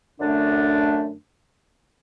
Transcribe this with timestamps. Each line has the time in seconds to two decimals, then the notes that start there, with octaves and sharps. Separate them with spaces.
0.18 F#2 D3 A3 D4